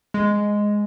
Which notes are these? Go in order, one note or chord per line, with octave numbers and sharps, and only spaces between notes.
G#3